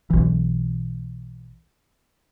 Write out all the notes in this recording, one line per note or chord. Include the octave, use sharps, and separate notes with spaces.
B1 E3